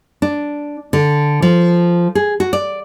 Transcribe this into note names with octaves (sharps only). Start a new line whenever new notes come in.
D4
D3
F3
G#4
F#4
D5